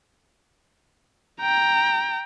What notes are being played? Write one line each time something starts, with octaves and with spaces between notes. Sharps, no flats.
G5 A#5